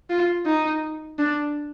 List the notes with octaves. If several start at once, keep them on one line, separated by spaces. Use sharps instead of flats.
F4
D#4
D4